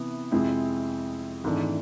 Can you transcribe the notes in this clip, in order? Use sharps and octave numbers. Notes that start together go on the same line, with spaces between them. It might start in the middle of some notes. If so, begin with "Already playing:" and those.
Already playing: C3 E3 B3
F2 C3 G#3 C4 E4
G#1 G#2 E3 A3 D4